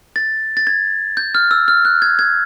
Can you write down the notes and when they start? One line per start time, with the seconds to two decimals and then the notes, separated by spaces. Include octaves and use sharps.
0.16 A6
0.57 A6
0.67 G#6
1.17 G6
1.35 F6
1.51 E6
1.68 F6
1.85 F#6
2.02 G#6
2.19 G#6